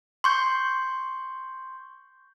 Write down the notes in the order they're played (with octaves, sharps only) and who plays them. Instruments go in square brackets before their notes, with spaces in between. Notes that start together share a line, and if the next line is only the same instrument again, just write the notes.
[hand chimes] C6 C#6 G6